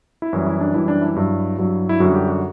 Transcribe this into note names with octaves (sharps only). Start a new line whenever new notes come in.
E4
F#2 E3 G3 F#4
E4
D4
F#2 E3 G3 E4
D4
E4
G2 F#3
G2 F#3
E4
F#2 D3 G3 F#4
G4
F#4